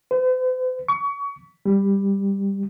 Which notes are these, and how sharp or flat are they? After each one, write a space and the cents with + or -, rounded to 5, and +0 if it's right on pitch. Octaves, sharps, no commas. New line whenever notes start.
C5 -45
C#6 +30
G3 +10